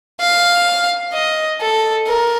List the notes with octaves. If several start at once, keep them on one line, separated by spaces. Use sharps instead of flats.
F5
D#5
A4
A#4